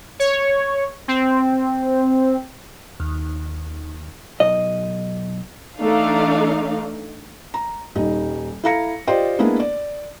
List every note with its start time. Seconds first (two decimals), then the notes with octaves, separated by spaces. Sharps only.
0.20 C#5
1.08 C4
3.00 D#2
4.40 B1 D#5
5.79 E3 A3 D4 D#4 F5
7.54 A#5
7.95 D#1 G3 D#4
8.64 E4 A4 F5 A#5 A#6 C#7
9.07 F4 G4 C5 D5 D#5 G5
9.39 G#3 A#3 B3 D4 E4 G#4
9.60 D5